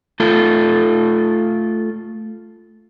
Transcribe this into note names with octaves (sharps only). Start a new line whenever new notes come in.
A3 F4 A4